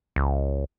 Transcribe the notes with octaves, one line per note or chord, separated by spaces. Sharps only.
C#2